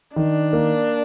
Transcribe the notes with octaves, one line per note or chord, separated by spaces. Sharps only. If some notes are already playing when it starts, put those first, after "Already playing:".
D#3 D4
A#3